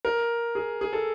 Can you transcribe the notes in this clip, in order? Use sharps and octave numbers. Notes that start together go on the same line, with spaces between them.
A#4
G#4
G#4
A4